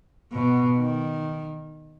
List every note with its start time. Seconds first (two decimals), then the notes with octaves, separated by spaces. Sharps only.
0.32 B2
0.78 D#3